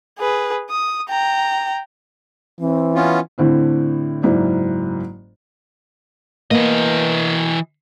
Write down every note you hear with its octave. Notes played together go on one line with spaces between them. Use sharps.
G#4 B4
D#6
G5 A#5
E3 C4
B3 C#4 F4
A2 D3 C4 E4
F#1 G#2 E4 D5
E3 A#3 B3 D#5